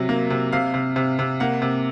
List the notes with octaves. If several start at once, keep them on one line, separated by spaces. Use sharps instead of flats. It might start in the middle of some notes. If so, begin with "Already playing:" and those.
Already playing: C3 F#3
A#3
C3
C3 F5
C3
C3
C3
A#3 F#5
C3